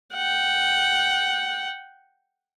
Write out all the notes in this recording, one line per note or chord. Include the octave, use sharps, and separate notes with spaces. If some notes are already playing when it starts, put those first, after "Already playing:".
F#5 G5